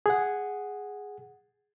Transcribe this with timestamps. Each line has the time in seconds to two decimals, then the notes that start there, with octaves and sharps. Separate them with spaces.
0.06 G#4 F#5